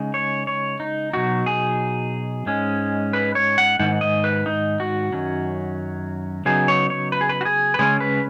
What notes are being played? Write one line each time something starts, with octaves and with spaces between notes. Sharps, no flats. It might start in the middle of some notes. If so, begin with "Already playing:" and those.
Already playing: C#3 G#3 D#4
C#5
C#5
D#4
B2 F#3 D#4 F#4
G#4
G#2 G#3 C#4
B4
C#5
F#5
G#2 D#3 F#5
D#5
B4
D#4
F#4
F#2 D#3 F#3 C#4
C#3 F#3 B3 D#4 G#4
C#5
C#5
B4
G#4
B4
F#4
G#4
B4
C#3 G#3 C#4 G#4
B4